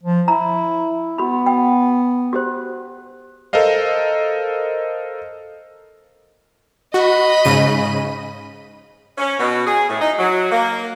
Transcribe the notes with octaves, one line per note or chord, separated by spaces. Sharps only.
F3
E4 A#5
B3 F#4 B5
G5
F#4 G4 C5
A4 A#4 C5 D#5 F5
F#4 D#5 B5
G#2 C#3 D#7
C#4
B2
G#4
A2
D#4
F#3
A#3